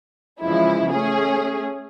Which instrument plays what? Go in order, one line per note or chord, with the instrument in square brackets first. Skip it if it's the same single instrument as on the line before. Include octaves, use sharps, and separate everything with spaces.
[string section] C#3 E3 F3 G#3 E4
A3 C#4 G#4